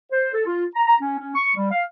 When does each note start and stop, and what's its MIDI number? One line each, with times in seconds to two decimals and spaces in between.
0.12 0.30 72
0.34 0.45 69
0.46 0.65 65
0.75 0.82 82
0.87 0.96 82
1.00 1.19 61
1.19 1.31 61
1.36 1.51 85
1.56 1.70 55
1.71 1.83 77